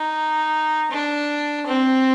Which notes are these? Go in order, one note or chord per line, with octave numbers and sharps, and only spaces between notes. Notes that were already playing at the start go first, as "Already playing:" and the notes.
Already playing: D#4
D4
C4